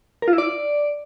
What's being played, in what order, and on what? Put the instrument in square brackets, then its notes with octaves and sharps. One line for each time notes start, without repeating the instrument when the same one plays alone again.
[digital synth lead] A#4
F4
E4
D5